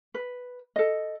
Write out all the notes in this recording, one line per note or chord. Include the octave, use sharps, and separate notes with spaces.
B4
A4 D#5